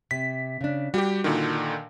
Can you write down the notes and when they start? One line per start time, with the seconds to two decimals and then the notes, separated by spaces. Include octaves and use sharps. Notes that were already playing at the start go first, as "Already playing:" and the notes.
0.11 C3 B6
0.61 C#3 D4
0.94 G3 F#4 G4
1.24 A#2 D3 D#3